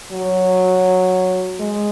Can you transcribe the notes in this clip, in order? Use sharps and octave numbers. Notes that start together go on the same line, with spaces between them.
F#3
G#3